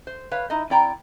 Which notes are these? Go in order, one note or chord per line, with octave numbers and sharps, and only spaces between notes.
C5
B4 C#5 F5
D#4 E4 D#5
C4 E4 D5 G5 A#5